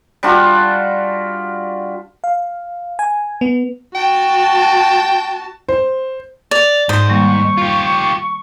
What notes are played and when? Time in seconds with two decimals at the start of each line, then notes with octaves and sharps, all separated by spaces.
0.23 G3 D4 F4 F#4
2.24 F5
2.99 G#5
3.41 B3
3.95 F#4 G5 A5
5.69 C5
6.51 D5 F7
6.89 G#2 C5 D#6
7.09 D#3 G3 A#3 C#6
7.57 F4 G4